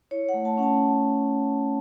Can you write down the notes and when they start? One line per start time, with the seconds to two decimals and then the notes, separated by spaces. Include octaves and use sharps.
0.11 E4 C#5
0.29 F#5
0.34 A3
0.45 A5
0.57 C#4 F#5
0.63 A5